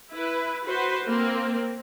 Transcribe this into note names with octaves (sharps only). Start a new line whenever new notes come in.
E4 B4
F#4 B4 C5
A#3 C4